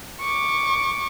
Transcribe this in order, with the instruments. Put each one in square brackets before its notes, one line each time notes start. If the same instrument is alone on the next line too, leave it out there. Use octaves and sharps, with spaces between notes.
[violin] C#6 D6